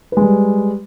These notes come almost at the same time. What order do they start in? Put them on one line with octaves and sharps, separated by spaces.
B4 G#3 G3